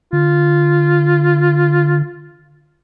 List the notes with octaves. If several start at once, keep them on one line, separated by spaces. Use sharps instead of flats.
D3 F4